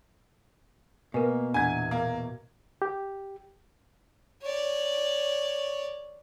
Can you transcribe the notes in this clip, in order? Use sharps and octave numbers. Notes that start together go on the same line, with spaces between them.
B2 A#3 A#4 B4 G#5
E2 A#2 D4 F#5 G#5 A#5 G#6
A#3 A#5
G4
C#5 D5